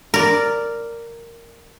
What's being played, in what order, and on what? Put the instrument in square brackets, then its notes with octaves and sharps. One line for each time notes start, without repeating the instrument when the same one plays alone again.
[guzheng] A#4 D5